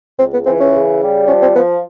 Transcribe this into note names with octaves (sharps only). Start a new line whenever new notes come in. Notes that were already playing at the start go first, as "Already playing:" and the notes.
C#2 C4
B3
E3 C4
C#4
C#3
G3
F3 C#4
C4
F3 B3